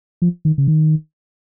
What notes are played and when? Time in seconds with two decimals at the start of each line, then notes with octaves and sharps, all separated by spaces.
0.22 F3
0.45 D#3
0.58 C#3
0.68 D#3